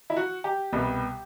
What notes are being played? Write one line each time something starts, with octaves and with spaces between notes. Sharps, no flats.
E4
F#4
G4
C2 B2 G3 B3